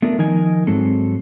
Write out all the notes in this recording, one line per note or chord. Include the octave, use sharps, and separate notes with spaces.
A3 B3 D4 F4 A#4
D#3 F3 D#4 A#4 D#5 G#5
G#2 F#3 G#3 C4 A4